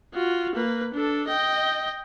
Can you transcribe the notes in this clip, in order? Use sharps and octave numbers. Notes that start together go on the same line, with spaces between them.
F4 F#4
A#3 B4
D4 A4
D#5 G5